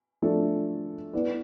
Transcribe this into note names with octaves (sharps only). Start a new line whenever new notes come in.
F3 A3 D4 A4
B3 E4 B4 D5